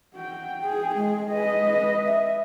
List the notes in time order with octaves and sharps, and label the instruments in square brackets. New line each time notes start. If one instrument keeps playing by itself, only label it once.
[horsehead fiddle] F#4 G5
[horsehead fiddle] G#4 [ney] G5
[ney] G#3 [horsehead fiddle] G#4
[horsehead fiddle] B4 D#5
[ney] E5